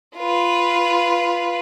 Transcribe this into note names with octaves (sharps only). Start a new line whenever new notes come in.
F4 B4